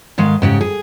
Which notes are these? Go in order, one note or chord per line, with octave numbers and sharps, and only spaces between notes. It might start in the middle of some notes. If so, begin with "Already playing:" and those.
G#2 D#3 G#3 F5
G#2 C#3 G4
G#4